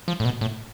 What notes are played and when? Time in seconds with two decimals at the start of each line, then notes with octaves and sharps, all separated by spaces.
0.08 F3
0.20 A2
0.25 B2
0.41 A2